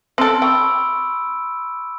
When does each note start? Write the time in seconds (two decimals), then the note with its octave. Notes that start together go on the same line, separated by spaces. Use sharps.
0.18 C4 A4 C6 D7
0.42 G5 B5 C#6 E6